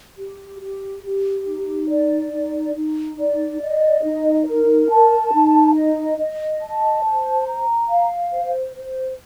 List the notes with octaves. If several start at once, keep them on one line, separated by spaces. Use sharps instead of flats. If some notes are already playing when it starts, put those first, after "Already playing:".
G4
G4
G4
D#4
D5
D#4
D#4
D5
D#5
D#4
A#4
A5
D#4
D#5
D#5
A5
C5
A#5
F5
C5
C5